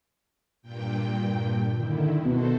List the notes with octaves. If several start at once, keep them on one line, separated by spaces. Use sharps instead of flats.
G2 A#2 G5
D3 D#3 E4
B2 F#4 A4 C5